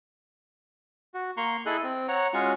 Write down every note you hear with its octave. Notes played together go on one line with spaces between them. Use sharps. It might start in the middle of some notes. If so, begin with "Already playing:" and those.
F#4
A#3 A#5 C6 C#6
E4 G#4 A4 D#5 F#6
C4
C#5 F#5 A#5
G#3 C#4 F4 F#4 C#6